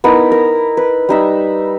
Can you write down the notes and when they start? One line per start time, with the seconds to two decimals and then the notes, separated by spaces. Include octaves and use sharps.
0.04 B3 D#4 E4 A#4
0.32 A#4
0.77 B4
1.09 G3 D#4 E5